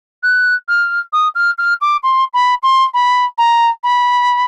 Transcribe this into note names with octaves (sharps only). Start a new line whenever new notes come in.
F#6
F6
D#6
F6
F6
D6
C6
B5
C6
B5
A#5
B5